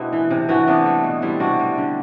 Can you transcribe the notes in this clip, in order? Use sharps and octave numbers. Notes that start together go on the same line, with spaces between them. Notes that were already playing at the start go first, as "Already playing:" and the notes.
Already playing: B2 A3 C4 D4 E4
E3
C3
E3 D4 F#4
C3 B3 D4
A3
B2
G3 C4 E4
C3 D4 F#4
G3
D3